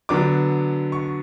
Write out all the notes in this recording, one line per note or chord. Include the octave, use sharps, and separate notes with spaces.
D3 F#3 B3 D4 D6
C#6